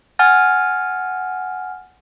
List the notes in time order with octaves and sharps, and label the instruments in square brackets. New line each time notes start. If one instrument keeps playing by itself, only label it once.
[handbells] F#5 G#5 F6 A6